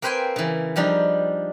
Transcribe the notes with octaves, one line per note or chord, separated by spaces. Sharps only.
A#3 C4 B4 C5 G5 G#5
C#3 E3
F3 G3 D4 D#4